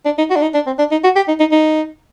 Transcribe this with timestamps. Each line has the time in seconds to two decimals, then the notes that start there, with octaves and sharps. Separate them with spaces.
0.05 D4
0.18 D#4
0.30 F#4
0.36 D4
0.42 D#4
0.54 D4
0.67 C4
0.79 D4
0.91 D#4
1.04 F#4
1.16 G4
1.28 D#4
1.40 D#4
1.52 D#4